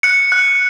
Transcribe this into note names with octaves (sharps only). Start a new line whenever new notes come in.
F#6 C#7
F#6